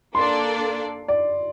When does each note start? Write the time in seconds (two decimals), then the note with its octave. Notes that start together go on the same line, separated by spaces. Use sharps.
0.15 A#3 D4 A4 D5 C6
1.08 D5